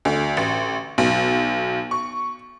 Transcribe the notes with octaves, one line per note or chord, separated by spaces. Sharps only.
D2
A1
B1
C#6